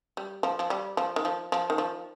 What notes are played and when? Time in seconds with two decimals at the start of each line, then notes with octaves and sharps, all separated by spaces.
0.17 G3
0.43 F3
0.59 F3
0.70 G3
0.97 F3
1.16 D#3
1.25 F3
1.52 F3
1.70 D#3
1.78 F3